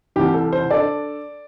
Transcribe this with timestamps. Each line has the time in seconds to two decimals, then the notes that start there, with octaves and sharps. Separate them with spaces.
0.16 C2 C3 E3 G4
0.34 A4
0.53 C5
0.70 D4 A4 D5